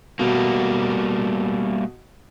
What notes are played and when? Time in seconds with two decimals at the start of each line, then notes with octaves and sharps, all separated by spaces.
0.19 B2 G3 A3 A#3